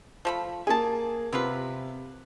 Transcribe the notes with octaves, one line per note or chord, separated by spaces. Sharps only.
F3 A3 B5
A#3 G#4 G#5 A5
C3 B3 F4 B4